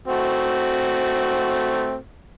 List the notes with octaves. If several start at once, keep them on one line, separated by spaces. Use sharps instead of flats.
A3 C4 F#4